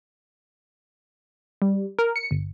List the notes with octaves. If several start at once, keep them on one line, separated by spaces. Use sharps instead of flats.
G3
A#4
C#7
G1